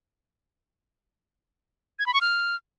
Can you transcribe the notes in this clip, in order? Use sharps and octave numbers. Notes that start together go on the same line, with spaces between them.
G#6
B5
C#6
F6